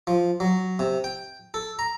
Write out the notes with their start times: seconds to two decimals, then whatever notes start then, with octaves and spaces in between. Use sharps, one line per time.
0.07 F3
0.40 F#3
0.79 C3
1.04 G5
1.54 A4
1.79 A#5